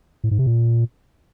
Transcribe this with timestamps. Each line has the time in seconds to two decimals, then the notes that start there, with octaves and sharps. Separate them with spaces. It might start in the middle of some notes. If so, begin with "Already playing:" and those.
0.24 A2
0.31 G#2
0.39 C3
0.46 A#2